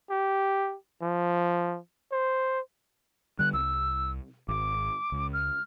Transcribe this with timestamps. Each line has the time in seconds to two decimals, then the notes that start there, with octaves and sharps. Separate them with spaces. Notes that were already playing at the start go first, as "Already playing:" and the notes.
0.10 G4
1.02 F3
2.12 C5
3.39 D3 G3 F#6
3.54 C2 E6
4.48 G#1 D6
5.12 C#2
5.33 F6